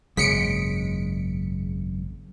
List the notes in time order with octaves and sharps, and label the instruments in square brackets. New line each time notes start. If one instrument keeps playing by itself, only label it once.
[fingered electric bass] G#1 C#3 A#3 [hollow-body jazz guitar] F#2 G#3 [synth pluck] B6 C#7 D7